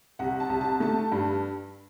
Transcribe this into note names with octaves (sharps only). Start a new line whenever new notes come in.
C2 F#5
A5
C2
A5
A3 A5
G2